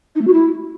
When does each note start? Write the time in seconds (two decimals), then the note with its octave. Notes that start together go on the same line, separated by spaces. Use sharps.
0.15 D#4
0.21 A3
0.27 F#4
0.33 E4